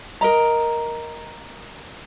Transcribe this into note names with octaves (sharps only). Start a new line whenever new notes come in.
A#4 D#5 A#5